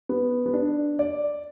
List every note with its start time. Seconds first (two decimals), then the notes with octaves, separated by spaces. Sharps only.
0.09 B3
0.46 B3
0.53 D4
0.99 D5